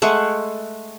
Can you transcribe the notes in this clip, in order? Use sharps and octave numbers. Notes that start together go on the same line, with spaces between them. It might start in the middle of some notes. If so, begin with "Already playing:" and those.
G#3 A3 F#5